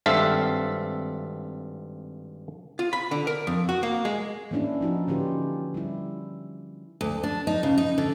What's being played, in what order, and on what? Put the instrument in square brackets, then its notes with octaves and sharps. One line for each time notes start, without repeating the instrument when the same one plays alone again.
[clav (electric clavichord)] G#1 G2 C4 A4 E5 F5
[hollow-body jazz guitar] F4
B5
D3
A#4
F2
F#4
A#3
G#3
[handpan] E3 A#3 C#4 D4 E4
F3 D#4 F#4
D3 C#4 F4 G4 B4
G3 E4
[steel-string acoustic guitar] D2
D4
D#4
C#3
D#4
D3